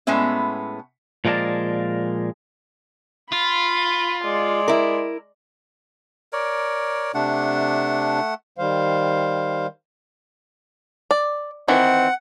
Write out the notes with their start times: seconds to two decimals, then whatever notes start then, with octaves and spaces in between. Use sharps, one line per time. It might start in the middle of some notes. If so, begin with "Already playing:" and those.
0.07 A2 G#3 B3 C#4 E5
1.25 A#2 F3 G#3 A#4 D5 A5
3.32 F4 B5
4.24 G#3 D5
4.68 E4 A#4
6.33 A#4 C#5 D5
7.14 C3 A3 D4 F#5
8.58 D#3 G3 C5 F5
11.11 D5
11.68 D#3 E3 C4 F#5